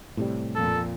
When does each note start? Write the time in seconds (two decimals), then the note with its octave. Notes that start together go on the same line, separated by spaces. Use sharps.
0.17 A2 C3 G3
0.55 F2 A#2 A4